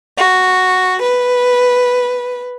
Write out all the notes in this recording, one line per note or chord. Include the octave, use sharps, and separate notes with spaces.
F#4
B4